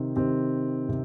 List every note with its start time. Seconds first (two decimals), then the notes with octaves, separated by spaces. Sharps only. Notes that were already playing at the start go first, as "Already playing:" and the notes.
Already playing: C3 D#3 C4 G4
0.16 C3 D#3 C4 G4
0.89 C3